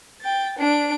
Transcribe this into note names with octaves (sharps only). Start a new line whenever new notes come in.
G5 A6
D4 D7